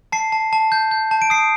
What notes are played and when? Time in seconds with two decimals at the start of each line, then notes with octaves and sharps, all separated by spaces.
0.12 A5 C7
0.32 A5
0.53 A5
0.72 G6
0.91 G6
1.11 A5
1.22 D7
1.30 D#6 C7